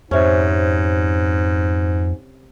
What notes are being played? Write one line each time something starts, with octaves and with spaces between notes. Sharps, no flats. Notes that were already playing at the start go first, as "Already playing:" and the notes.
F2 G#2 C3 C#4